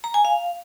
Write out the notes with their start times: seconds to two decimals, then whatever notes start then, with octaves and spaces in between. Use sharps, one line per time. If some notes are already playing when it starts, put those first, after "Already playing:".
0.04 A#5
0.14 G#5
0.25 F5